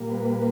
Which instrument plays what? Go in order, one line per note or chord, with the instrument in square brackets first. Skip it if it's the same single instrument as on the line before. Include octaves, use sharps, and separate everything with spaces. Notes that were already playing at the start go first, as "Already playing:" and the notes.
Already playing: [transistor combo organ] A#2 G3 A#3
B4